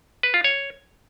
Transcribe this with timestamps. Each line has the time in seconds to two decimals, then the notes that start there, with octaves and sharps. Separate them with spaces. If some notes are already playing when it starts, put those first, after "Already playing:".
0.23 B4
0.34 F4
0.44 C#5